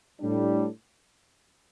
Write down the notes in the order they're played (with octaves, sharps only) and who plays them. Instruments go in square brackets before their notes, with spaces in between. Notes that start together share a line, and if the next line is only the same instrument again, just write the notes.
[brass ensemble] A2 G3 D4